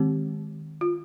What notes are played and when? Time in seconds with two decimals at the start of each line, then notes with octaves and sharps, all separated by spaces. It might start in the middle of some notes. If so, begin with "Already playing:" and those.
Already playing: D#3 G#3 C4 G4
0.81 F4